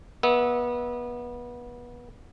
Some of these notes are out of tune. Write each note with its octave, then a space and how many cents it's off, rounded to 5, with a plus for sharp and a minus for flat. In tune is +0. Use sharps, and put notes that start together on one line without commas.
B3 -25 E5 -35